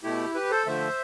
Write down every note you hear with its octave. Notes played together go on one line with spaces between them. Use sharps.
B2 A3 E4 G4
G4 B4
A4 C5
D3 F3 A3 C5 E5